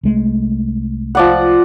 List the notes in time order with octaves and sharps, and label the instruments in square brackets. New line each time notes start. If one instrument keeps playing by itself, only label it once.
[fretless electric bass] C2 G#3 A3
[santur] F3 D5 F#5